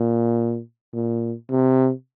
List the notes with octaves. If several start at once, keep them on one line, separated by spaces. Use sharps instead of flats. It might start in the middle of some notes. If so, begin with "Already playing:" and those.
Already playing: A#2
A#2
C3